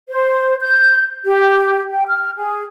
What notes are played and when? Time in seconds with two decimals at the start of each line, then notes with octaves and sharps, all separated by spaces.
0.09 C5
0.61 G6
1.25 G4
1.90 G5
2.07 F6
2.37 G#4